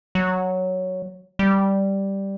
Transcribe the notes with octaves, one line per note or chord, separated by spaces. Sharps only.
F#3
G3